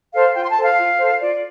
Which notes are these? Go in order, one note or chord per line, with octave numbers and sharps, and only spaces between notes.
A4 C5 F5
F4 G5
C6
A5
A4 C5
F5
F4
A4 C5
F4 D5